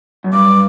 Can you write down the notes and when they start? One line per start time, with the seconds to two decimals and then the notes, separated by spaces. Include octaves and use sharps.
0.24 F#2
0.33 G2 D6